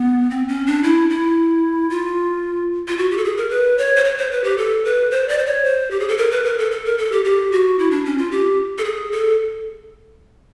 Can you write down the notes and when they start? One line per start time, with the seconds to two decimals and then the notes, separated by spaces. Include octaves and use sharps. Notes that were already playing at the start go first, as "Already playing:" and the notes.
Already playing: B3
0.30 C4
0.48 C#4
0.67 D4
0.83 E4
1.10 E4
1.90 F4
2.88 F4
2.98 F#4
3.11 G4
3.17 A4
3.25 G#4
3.37 A#4
3.50 B4
3.78 C#5
3.96 C5
4.04 C#5
4.18 C5
4.31 B4
4.44 G4
4.58 A4
4.85 B4
5.11 C5
5.28 D5
5.38 C5
5.46 C#5
5.64 C5
5.91 G4
6.00 G#4
6.09 A4
6.17 A#4
6.31 B4
6.44 A#4
6.58 A4
6.72 A4
6.85 A#4
6.98 A4
7.12 G4
7.25 G4
7.52 F#4
7.79 E4
7.91 D4
8.05 C#4
8.18 F4
8.31 G4
8.78 A4
8.84 G#4
9.12 A4